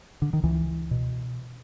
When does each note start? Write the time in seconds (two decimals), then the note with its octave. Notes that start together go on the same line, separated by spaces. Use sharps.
0.22 D3
0.33 D#3
0.43 C#2 E3
0.91 B2